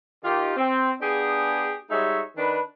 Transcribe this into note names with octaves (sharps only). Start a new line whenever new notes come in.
D#3 F4 G4
C4
B3 D4 G4 G#4
G3 G#3 D#4 F#4 C#5 E5
D#3 D4 B4